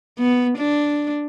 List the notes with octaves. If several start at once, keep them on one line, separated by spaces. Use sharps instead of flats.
B3
D4